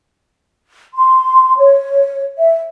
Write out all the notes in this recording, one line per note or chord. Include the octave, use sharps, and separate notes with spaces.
C6
C#5
E5